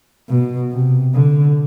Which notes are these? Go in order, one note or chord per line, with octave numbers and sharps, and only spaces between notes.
B2
C3
D3